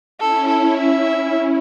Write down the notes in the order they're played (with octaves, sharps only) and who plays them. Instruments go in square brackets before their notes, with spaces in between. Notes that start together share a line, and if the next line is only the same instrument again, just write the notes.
[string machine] C#4 E4 [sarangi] A4
[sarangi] A4
E5